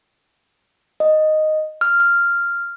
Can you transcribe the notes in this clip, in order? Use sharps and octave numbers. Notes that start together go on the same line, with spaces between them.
D#5
F6
F6